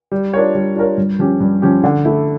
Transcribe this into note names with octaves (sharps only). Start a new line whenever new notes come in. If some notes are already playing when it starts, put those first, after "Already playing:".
G3
D4 F4 A#4 C#5
G3
D4 F4 A#4 C#5
G2
F3 C#4 G4
G2
F3 C#4 G4
D3
A3 E4